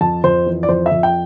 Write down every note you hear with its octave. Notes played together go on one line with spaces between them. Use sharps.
F2 A5
F2 C5
E3
D5
F2 C5
E5
F2
G5